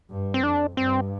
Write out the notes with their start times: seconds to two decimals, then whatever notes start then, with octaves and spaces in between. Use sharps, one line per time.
0.11 G2
0.34 C4
0.43 F2 D4
0.77 G2 C4